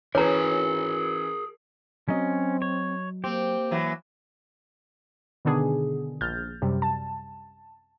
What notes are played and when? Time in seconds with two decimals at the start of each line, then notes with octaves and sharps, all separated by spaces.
0.15 E3 C#4 G#4 A#4 C#5 A#5
2.09 F#3 C4 C#4 D#5
2.62 C#5
3.24 A#3 C4 G4
3.71 E3 F#3
5.45 B2 D3 D#3 B3 D4 G#4
6.21 A#1 F6 G6 A6
6.62 F#2 C3 G3
6.82 A5